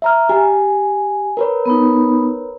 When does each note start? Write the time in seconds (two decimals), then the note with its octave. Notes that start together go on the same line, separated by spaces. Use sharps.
0.02 E5 A#5 F6
0.29 G4 G#5
1.37 A#4 B4 C#5
1.66 B3 D#4